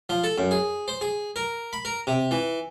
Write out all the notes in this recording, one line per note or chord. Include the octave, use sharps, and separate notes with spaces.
F3
A4
F#2
G#4
C5
G#4
A#4
B5
A#4
C3
E3